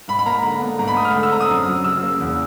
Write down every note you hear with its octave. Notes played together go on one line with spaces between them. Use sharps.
G#2 B5
B5
A#3 A#5
D3
B3
G#2 A#5
B5
A3 D#6
F6
D3
E6
C4 A#5
D#6
F#2
F#3
C#3 E6
A#3
E2